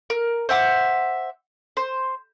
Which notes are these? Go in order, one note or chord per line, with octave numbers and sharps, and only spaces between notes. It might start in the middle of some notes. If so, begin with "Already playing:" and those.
A#4
C5 E5 F#5 D6
C5